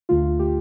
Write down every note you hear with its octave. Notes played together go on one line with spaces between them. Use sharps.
D2 D3 A3 F4
D3 A3 G4